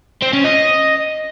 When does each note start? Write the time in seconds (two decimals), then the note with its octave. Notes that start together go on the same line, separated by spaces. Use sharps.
0.22 C4
0.33 C#4
0.44 D#5